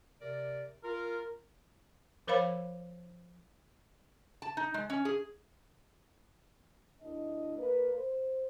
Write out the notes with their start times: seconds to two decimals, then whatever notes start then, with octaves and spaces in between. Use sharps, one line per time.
0.21 C3 A#4 D5
0.84 F4 A#4
2.28 F3 A#4 C5 C#5 F5 B5
4.42 A5
4.57 D#4
4.74 G#3
4.90 C#4
5.05 G#4
7.01 D2 D4 E4 D#5
7.57 A#3 A#4 B4
7.95 C5